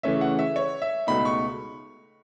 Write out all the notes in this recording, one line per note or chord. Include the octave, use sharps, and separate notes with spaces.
C#3 E3 A3 C#4 E5
F#5
E5
C#5
E5
C#2 B2 A3 D#4 B5
C#6